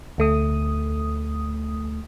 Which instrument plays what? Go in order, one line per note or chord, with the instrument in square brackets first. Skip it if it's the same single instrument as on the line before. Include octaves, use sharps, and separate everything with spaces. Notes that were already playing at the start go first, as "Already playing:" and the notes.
[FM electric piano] D2 A3 D#6